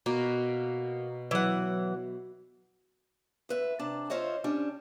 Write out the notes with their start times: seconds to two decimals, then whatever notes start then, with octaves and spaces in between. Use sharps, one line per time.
0.06 B2 A#3
1.31 E3 F#3 F#5
3.49 D2 B4 E5
3.79 C3 D4 A5
4.10 F4 C5 C#5 D#5 E5
4.44 G3 C#4 D4